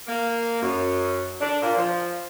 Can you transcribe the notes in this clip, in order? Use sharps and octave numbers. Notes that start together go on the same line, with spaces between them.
A#3
F#2
D4
A#2
F3